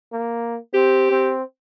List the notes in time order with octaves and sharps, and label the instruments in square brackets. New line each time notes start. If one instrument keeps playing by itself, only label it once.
[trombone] A#3
[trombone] C4 [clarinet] G4
[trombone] C4